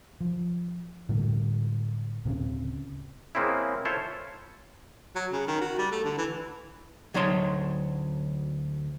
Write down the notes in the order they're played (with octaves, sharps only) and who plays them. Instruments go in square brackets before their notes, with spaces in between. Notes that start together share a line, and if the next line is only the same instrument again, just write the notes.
[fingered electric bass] F3
A2 D3 G3 G#3
D1 C#3 C4 C#4
[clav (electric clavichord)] C#3 G#3 A#3 C4 C#4 E4
E4 F4 A4 C5 C#5
[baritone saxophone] F#3
C#3
D#3
F#4
G3
A3
D3
E3
[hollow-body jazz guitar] D2 F#3 D#4 C#5 C6